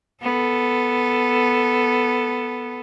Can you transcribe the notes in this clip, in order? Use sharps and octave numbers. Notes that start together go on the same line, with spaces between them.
B3 A4